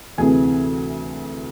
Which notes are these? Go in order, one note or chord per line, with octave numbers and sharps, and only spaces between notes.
D2 C3 E3 G#4 G#5